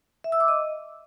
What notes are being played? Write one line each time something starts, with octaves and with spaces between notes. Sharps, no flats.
E5
E6
D6
D#5